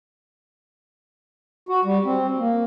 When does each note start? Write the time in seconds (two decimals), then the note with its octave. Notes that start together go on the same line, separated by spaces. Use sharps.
1.69 F#4
1.85 G3
2.05 C4
2.39 A#3